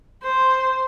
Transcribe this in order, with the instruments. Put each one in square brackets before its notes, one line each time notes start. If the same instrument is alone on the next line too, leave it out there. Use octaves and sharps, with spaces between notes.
[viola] C5